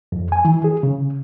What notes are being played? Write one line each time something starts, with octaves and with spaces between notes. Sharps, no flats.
F2
G#5
E3
G#4
C#3